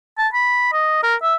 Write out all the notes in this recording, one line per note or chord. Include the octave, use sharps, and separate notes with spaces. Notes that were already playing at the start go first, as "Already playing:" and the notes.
A5
B5
D#5
A#4
E5